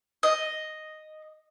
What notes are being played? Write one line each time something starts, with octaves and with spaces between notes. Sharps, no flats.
D#5